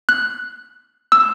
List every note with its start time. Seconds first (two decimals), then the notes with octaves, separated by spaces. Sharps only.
0.09 F#6
1.12 E6